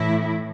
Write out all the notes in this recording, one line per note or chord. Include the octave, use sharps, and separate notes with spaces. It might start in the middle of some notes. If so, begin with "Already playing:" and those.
Already playing: A2 E3 E4